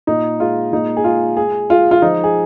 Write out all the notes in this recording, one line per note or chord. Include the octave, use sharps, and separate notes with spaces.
A#2 D#4
G#3 F4
A#2 D#4
G#4
G#3 F4
G#3 G#4
G#3 F4
F4
F3 D#4
G#4